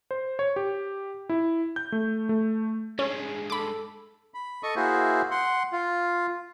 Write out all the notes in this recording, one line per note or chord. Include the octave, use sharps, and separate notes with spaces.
C5
C#5
G4
E4
G6
A3
A3
G2 G#3 C#4 G#4
A4 B5 D6
B5
A4 D#5 C#6 D#6
A#3 E4 F#4 G#4 C5 E5
F#5 C6
F4